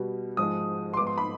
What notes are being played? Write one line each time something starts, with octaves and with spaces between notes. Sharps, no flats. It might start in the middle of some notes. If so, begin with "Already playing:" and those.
Already playing: B2 G3 B3
G#2 F3 G#3 D#6
C6
G#2 F3 B3 D6
C6
B5